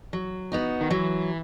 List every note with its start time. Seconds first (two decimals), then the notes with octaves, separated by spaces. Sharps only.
0.13 F#3
0.52 B3 D#4 F#4
0.81 D#3
0.90 E3 F#3